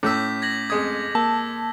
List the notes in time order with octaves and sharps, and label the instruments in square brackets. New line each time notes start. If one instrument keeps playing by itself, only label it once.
[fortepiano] A2 E6 [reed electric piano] A3 C#4 [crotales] D6 G6 B6
[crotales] G#6 A#6 F#7
[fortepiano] F2 G#3 D#6 [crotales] G#6
[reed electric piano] A#3 [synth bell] A5 [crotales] E6